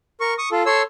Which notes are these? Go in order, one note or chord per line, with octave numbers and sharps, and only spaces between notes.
A#4 C#6
C#6 D#6
F4 A4
A4 C#5 C6 E6